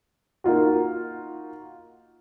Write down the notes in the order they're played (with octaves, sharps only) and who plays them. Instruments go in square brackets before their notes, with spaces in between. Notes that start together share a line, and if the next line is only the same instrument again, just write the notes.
[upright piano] A#3 D#4 F4 F#4